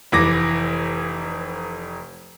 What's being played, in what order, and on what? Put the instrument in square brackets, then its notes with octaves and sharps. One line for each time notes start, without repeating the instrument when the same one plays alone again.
[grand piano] F1 E3 D6 A#6